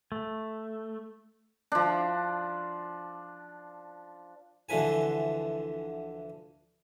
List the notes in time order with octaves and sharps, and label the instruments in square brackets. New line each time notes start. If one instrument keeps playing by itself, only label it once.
[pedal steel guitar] A3
[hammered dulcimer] F3 D4
[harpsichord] D2 D3 E3 F3 B4 G#5